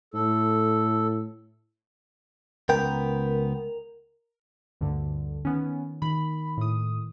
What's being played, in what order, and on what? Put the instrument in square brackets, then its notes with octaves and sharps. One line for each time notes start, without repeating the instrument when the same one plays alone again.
[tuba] A2 [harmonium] A4
[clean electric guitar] C#2 B3 G5 [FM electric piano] A#4
[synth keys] D2 G2 D3
[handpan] D#3 [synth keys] B3 C#4
[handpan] D#3 [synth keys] B5
[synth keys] A2 D#6